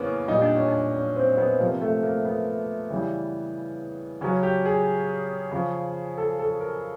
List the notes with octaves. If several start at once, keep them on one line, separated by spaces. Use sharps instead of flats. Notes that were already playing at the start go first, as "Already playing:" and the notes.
Already playing: C#3 E3 A#3 B3 C#4
A#2 G3 D#4
D4
C#4
D4
C#4
C4
B3
C3 F3 A#3
A3
A#3
B3
C#3 E3 G3
C#3 F#3 C#4
G4
G#4
C#3 F3
A4
A4
A#4